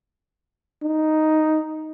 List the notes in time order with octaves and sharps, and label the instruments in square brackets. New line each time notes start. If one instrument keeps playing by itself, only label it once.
[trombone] D#4